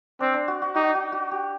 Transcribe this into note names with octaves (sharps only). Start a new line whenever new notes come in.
C4 D4
D4
F#4
F#4
D#4 F#4
F#4
F#4
G4